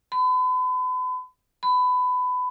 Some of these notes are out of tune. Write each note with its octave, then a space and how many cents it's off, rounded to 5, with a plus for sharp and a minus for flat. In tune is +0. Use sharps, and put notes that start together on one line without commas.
B5 +40
B5 +20